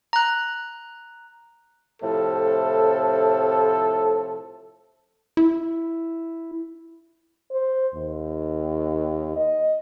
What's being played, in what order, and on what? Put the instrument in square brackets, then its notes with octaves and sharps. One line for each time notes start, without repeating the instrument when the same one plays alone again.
[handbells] A#5 F#6
[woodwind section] A2 C3 F3 [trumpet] A4
[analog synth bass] E4
[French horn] C5
D#2
D#5